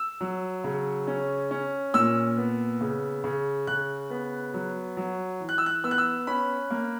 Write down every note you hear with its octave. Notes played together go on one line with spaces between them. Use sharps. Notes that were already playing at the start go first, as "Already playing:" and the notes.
Already playing: E6
F#3
C#3
C#4
C#4
A#2 E6
B3
C#3
C#3
C#3 F#6
B3
F#3
F#3
E3
F#6
E6
F#6
B3 E6
F#6
E6
C#4 B5
A#3